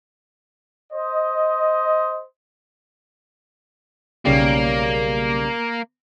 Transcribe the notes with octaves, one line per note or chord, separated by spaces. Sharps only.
C5 D#5
B1 C#3 G3 A#3